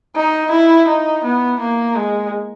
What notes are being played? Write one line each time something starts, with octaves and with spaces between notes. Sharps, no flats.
D#4
E4
D#4
B3
A#3
G#3